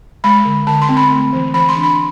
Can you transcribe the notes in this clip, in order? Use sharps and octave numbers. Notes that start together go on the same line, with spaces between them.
G#3 B5
D3
D3 A5
C6
C4
B5
A3
E3
E3 B5
C6
D4
B5